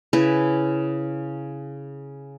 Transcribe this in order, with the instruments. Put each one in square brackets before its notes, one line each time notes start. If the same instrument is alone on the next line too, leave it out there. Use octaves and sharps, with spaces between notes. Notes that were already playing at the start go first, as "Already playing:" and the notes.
[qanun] C#3 E4 B4